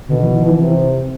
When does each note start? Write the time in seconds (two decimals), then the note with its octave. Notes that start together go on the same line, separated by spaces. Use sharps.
0.09 B2 D3
0.21 E3
0.33 E3
0.45 E3
0.56 C3